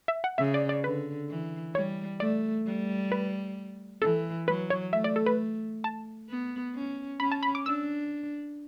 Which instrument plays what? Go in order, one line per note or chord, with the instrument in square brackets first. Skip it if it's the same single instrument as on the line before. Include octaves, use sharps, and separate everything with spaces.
[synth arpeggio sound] E5
F#5
[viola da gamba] C#3 [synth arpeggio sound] E5
[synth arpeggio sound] D5
D5
[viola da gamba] D3 [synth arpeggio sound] B4
[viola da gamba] E3
[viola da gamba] G3 [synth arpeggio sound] C#5
[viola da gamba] A3 [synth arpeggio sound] D5
[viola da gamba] G3
[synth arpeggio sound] B4
[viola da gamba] E3 [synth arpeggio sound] A4
[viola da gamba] F#3 [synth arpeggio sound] B4
[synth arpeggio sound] C#5
[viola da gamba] A3 [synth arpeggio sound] E5
[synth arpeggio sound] D5
A4
B4
A5
[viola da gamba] B3
C#4
[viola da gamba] C#4 [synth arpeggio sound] B5
[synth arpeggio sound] A5
B5
D6
[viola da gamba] D4 [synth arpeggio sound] E6